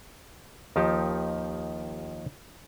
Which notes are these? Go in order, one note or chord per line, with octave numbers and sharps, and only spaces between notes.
D#2 D#3 F3 D#4 G4 A5